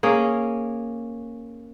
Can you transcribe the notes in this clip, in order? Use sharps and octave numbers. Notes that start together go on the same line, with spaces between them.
A#3 C#4 G#4